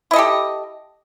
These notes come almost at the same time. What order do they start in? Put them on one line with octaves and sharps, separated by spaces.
E4 D#5 A4 G4